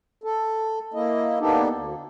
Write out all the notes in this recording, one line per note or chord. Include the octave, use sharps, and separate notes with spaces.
A4
A#3 E4 D#5
A#3 B3 D4 D#4 G4 A4
D2